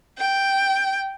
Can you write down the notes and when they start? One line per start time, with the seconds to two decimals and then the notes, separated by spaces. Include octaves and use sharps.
0.18 G5